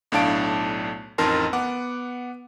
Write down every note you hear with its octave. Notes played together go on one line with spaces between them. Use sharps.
B1 A2 D4 F5 A5 D7
A1 F2 D#4 A#4 A5 C6
B3 F#5 D6